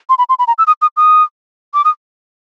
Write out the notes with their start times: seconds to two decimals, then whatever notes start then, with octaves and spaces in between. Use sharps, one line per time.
0.09 C6
0.18 B5
0.29 C6
0.39 B5
0.47 A#5
0.58 E6
0.67 D#6
0.82 D#6
0.97 D#6
1.74 D6
1.85 D#6